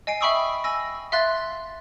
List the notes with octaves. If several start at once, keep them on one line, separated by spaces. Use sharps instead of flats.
D#5 G#5 C7 D7
E5 G5 B5 C#6 D#6 E6
G#5 E6 A#6
E5 F5 C6 F#6 A6